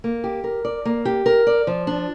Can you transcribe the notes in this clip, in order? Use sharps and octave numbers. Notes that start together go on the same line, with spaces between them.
A#3
G4
A#4
D5
A#3
G4
A#4
D5
F3
D4